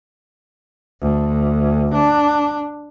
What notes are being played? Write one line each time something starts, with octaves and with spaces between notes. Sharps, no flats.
D2
D4